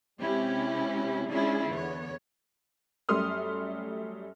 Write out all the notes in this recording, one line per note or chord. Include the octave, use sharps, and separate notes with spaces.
C3 G#3 C#4 E4 G4
G#3 C#4 D4 E4 F4 G#4
E2 D3 B3 C#5
F#2 G3 A3 C6 D#6 F6